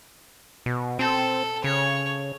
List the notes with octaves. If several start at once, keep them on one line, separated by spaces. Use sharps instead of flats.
B2
C4 A4
C#3 C#5